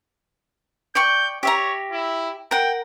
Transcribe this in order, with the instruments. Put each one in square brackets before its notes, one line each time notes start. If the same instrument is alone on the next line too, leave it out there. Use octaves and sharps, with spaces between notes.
[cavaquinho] D5 G5 C#6 [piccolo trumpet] G6
[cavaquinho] G4 E5 A#5 [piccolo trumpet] C#5
[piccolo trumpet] E4
[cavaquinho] A#4 F#5 [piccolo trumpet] G5